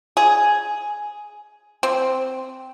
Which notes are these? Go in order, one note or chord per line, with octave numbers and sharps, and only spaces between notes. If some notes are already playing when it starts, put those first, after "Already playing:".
G#4
C4